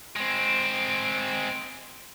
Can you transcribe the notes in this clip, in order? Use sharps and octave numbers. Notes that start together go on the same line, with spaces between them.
G#3 C4